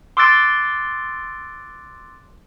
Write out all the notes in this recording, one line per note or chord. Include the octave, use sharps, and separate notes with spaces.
C6 D6 E6 F#6 A6 D7